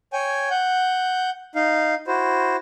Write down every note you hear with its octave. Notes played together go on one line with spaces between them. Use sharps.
C#5 G5 G#5
F#5 G6
D#4 F5
E4 F#4 C5